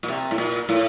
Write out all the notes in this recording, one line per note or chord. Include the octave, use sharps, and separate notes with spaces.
A#2
C3
A2
A#2
A2